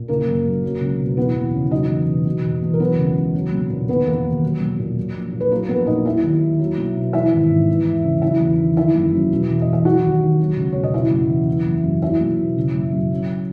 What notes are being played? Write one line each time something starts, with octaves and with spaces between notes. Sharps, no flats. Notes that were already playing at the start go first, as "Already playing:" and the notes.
Already playing: A#2
C#3 A#3 A#4
F#1
F#2
F#3
C#2
B2
E3 B3 B4
E2
C#3
F#3 D#4 D#5
E2
B2
B2
E1
E2
A#4
F#3 B3 B4
C#2
C#3
F#3
B1
A#2
D#3 B3 B4
E1 A#3 A#4
D#2
F#3
B1
A#2
F#3
A#1
A#2
B4
F#3 A#3 A#4
A#1 B3 B4
A#2 D#4 D#5
F#3 E4 E5
D#2
D#3
F#3
B1
B2
E3 E4 E5
G#1
G#2
E3
E2
C#3
F#3 E4 E5
E2
D#3
D#3 E4 E5
F#1
F#2
B2
E1
D#5
E2
E5
F#3 F#4 F#5
D#2
D#3
F#3
C#2
B2 C#5
D#5
C#3 E4 E5
F#1
E2
E3
F#1
F#2
F#3 E4 E5
B1
B2
C#3
F#1
F#2
F#3